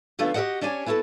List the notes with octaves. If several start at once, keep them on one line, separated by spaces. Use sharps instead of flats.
D3 F3 A3 B3 C#4 F4
F#4 G4 A#4 C5 D#5 F#5
C#4 D4 G4 C#5 G#5
B3 E4 F#4 A4 A5